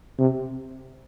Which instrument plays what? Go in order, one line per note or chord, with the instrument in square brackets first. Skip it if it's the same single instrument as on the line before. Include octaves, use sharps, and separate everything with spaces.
[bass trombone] C3